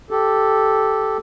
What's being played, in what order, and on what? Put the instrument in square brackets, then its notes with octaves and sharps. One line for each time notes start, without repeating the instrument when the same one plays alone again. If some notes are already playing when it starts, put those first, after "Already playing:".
[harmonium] G4 A4